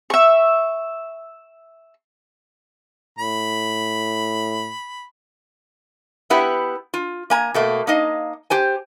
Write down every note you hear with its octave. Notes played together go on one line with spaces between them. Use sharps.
E5 C#6
A2 B5
B3 E4 G4 B4 F#5
F4
A#3 G#5 A#5
B2 A3 A#3
A#3 D#4 D#5 F5
G4 C5 G#5